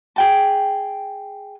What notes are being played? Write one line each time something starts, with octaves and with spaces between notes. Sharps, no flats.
G#4 G5 A5